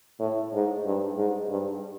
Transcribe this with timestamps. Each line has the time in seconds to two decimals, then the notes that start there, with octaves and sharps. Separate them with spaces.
0.20 A2
0.53 G#2
0.85 G2
1.17 G#2
1.49 G2